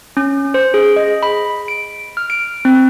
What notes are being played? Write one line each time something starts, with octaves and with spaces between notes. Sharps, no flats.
C#4
C5
G#4
D#5
B5
D7
F6
D7
C4